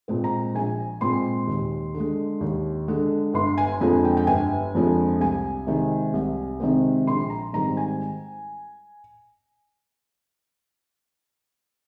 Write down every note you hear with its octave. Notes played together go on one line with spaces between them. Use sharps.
A#2 G#3 C4
A#5
A#1 G#5
A#2 G#3 C4 C6
D#2
D3
G#3
D#2
D3 G#3
G1 C6
G#5
F2 D3 F3 G#3 G#5
G5
G5
G1 G#5
F2 D3 F3 G#3
C2 G#5
C3 D#3 G#3 C4
C2
C3 D#3 G#3 C4
A#1 C6
A#5
G#2 D#3 G3 C4 A#5
G#5